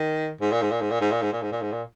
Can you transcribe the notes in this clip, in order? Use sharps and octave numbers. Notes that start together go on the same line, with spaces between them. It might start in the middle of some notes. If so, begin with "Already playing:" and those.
Already playing: D#3
G#2
A#2
G#2
A#2
G#2
A#2
G#2
A#2
G#2
A#2
G#2
A#2
G#2
A#2